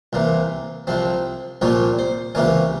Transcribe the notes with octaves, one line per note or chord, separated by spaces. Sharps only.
C2 C3 E3 A#3
C2 C3 F3 C4
C2 A#2 F3 A#3 C#4 C#5
C5
C#2 C3 E3 A#3 C#4 C#5